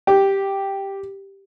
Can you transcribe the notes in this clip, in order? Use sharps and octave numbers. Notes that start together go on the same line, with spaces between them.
G4